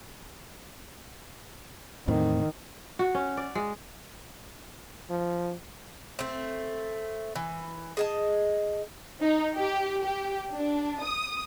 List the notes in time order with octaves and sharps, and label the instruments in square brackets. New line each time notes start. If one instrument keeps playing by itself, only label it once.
[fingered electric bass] E2 A2 C4 [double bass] D#3
[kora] F#4
C#4
D5
G#3
[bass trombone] F3
[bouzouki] A3 C4
E3
G#4 D#5 A5
[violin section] D#4
G4
G4
D4
D#6